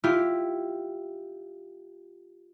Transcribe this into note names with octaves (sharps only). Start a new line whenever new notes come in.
E4 F4 G4